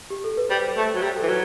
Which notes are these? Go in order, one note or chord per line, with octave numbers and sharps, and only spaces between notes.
G4
A4
B4
G3 C5
A3
F#3
G3
A4
E3
F#3 B4